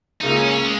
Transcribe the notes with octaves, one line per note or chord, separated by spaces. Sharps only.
C#2 C#3 A#3 D#4
C#4
C#4
G#3